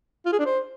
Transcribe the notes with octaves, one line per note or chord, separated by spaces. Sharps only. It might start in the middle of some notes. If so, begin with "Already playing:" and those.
F4
G#4
D4
C5